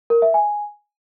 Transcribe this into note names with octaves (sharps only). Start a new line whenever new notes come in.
A#4
E5
G#5